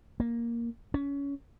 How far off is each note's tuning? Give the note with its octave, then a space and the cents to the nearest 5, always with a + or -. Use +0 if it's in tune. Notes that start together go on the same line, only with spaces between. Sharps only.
A#3 +5
C#4 +20